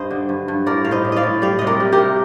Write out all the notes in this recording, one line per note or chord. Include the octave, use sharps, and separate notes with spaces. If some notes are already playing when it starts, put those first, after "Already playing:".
Already playing: G2 C5 D#5
D3
G2
G2
A2 A#4 D5
A2 F5
C5 D#5
A2
D5 D#5 F5
A2
G3 D5 F5
C3 D#5
A#4 D5
G3
G4 A#4
C3